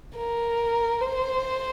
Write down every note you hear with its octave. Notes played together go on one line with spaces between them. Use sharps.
A#4
C5